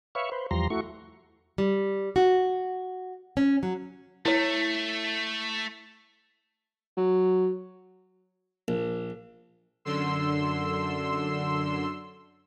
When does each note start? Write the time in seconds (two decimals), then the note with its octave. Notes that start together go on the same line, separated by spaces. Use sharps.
0.15 B4 C#5 E5 F5 C#6
0.32 B4 C5
0.51 E2 F3 G3 A#5 C6
0.70 A3 E4 F#4 C#6
1.58 G3
2.16 F#4
3.37 C#4
3.63 F#3
4.26 A3 E4 C#5
6.97 F#3
8.68 A#1
9.85 F#2 D3 C6 E6